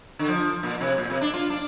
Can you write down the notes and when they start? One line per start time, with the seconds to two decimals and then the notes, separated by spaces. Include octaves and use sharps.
0.19 D3
0.28 F3
0.63 A#2
0.81 C3
0.98 A#2
1.10 C3
1.21 D4
1.34 F4
1.50 D4